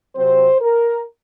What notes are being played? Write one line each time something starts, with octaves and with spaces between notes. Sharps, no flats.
C3 F#3 C4 C5
A#4